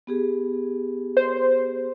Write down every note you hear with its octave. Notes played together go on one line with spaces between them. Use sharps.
B3 G4 G#4
C5